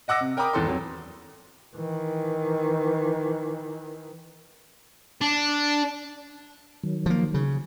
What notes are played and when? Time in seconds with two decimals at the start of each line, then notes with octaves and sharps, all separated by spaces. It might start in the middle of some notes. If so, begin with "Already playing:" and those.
0.08 D#5 F#5 D6 E6 A#6
0.21 C3
0.37 A#4 G5 A#5 B5 D6 D#6
0.53 G#1 E2 A4 C6
0.67 F2 F#3
1.76 D#3 E3
5.21 D4
6.84 D#3 F#3
7.06 F3 A#3
7.34 C#3